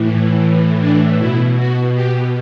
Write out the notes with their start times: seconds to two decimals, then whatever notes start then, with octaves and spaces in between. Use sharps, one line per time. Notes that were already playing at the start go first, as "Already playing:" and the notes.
Already playing: A2 E3
0.80 D4
1.18 B2 E4
1.56 F#4
1.94 G4